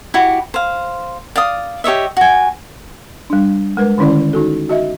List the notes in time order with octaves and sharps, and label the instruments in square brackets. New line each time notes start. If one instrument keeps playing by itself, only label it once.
[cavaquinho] E4 F#4 G4
C5 F5
D5 F5 D#6
G4 C#5 D#5 E5
F#4 G#5
[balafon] G3 D4
G#3 A#4 B4
D3 D#3 C#4 E4 D5
D#4 F#4 A4
F#4 D#5 E5